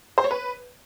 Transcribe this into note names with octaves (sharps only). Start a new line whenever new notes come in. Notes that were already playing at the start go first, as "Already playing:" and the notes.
C5
C#5
B4